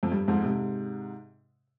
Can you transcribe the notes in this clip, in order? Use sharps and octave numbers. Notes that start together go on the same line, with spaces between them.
F2
G2
F2 G#2
G#2 C3